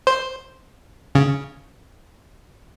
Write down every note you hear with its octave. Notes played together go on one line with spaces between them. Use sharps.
C5
C#3